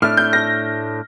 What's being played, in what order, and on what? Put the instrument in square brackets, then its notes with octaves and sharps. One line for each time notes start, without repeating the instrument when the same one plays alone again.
[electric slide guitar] A2 A3 D4 [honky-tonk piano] F6
[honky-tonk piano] G6
A#6